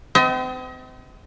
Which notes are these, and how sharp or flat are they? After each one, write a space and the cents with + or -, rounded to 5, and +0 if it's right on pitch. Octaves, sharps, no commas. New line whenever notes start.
C4 -40 D#5 +35